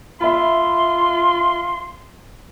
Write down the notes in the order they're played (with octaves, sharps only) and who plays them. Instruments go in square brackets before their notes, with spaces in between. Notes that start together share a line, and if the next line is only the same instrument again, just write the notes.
[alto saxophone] F4 [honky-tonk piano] E5 B5 [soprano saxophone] C6